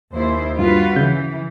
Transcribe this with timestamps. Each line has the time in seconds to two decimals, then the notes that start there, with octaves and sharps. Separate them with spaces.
0.14 D#2 E4 C5
0.59 G2 F4 F#4 B4
0.96 C#3 E3 G6